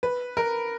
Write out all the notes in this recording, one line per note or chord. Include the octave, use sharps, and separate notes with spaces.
B4
A#4